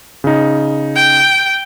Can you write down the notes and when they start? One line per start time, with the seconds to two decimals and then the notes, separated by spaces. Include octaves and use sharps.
0.24 C#3 D#4
0.96 G5